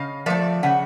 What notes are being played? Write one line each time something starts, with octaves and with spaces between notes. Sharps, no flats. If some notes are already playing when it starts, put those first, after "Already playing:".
Already playing: C#3 D#5 F5
F3 A3 D5 E5
C#3 E5 F#5